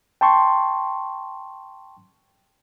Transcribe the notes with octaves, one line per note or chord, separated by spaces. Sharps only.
G5 A5 C6 C#6